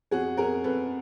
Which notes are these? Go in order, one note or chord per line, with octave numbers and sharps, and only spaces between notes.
F2 F#4 G#4
F2 G#4 A#4
F2 A4 B4